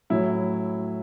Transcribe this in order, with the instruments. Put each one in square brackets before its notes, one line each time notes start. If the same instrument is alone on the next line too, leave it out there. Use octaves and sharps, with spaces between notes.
[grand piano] A2 F#3 C#4 E4